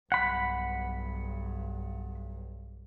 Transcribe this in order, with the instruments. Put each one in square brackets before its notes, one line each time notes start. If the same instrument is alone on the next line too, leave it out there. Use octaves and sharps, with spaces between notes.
[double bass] B1 G2 [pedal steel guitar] F#5 B5